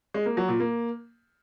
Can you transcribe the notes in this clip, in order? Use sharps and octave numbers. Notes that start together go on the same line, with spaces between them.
G#3
A#3
F#3
A#2
A#3